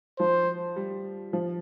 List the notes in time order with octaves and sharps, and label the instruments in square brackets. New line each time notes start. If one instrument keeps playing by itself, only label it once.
[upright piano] F3 [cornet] C5
[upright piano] G3
F3